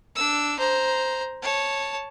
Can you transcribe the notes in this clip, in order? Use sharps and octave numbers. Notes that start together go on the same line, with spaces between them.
D4 E6
C5 A#5
C#5 A5